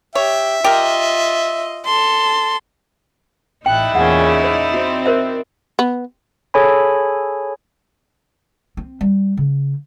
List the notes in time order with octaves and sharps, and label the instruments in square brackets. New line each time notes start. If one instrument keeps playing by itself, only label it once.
[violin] G4 [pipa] C#5 [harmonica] E5
[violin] F4 D#5 [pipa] G4 A#4
[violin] A4 C6
[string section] A1 F#6 [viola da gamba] D#4 E4 D5 [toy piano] G5
[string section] E2 A#2 C#3 [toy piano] F#5
[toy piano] C5
[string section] C4 [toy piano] F#4
[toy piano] A#4 C5 E5
[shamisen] B3
[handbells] G#4 A4 C#5 G#5 B5
[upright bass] C4
G3
C#3